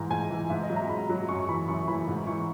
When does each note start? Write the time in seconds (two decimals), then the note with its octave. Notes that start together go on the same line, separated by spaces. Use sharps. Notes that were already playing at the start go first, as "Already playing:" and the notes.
Already playing: G#2 E3 A#5
0.10 G#2 G#5
0.30 E3
0.50 G#2 E5
0.63 D#5
0.70 F#3
0.76 A#5
0.89 G#2 B5
1.09 F#3
1.29 F#2 C#6
1.39 C#6
1.48 E3 B5
1.68 F#2 C#6
1.88 E3 B5
2.08 G#2
2.27 E3 C#6